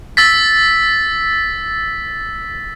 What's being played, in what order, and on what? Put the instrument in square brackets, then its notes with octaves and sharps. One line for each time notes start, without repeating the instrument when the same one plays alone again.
[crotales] E6 A6 B6